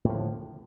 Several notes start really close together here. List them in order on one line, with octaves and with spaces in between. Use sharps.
A2 F3 D3